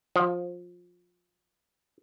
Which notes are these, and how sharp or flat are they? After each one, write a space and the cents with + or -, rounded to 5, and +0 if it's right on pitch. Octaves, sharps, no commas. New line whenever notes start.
F3 +20